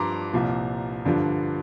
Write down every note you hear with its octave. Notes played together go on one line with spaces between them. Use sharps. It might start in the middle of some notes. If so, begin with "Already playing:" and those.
Already playing: G2 F3 A#5 C6 D6
C2 A#2 F3
G2 D3 F3